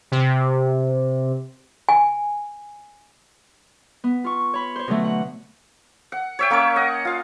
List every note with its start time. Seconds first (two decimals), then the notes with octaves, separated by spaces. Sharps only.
0.12 C3
1.89 G#5
4.04 B3
4.24 F4 C#6
4.54 C#5 B5
4.76 C5 C#5
4.88 B2 D3 F#3 A3
5.04 F#5
6.12 F#5
6.39 C#5 E5 G5
6.50 A#3 C#4 A#4 C#5
6.76 D#5 F#5
7.05 F4 F5